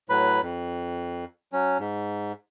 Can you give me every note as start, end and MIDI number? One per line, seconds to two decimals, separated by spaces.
0.10 0.41 45
0.10 0.41 54
0.10 0.41 71
0.10 0.41 83
0.42 1.25 41
1.53 1.78 54
1.53 1.78 61
1.79 2.32 44